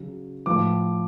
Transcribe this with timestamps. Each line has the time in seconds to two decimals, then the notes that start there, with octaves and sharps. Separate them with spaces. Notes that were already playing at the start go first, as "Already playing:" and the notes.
Already playing: C#3 F#3
0.46 A2 F3 D6